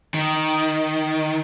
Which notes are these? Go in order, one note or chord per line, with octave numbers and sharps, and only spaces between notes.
D#3